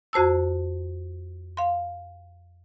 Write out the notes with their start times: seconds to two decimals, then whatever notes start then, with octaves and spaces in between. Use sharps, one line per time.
0.13 F2 F#4 C5 A5 E6
1.57 F5 C6